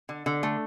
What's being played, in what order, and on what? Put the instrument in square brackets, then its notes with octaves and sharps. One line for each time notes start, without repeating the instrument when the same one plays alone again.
[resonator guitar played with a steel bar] D3
D3
A3